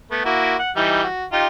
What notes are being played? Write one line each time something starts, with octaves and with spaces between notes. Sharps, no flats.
A3 B3
A#3 E4 F#4
F#5
E3 G3 D#4
F#4
D#4 F4 G4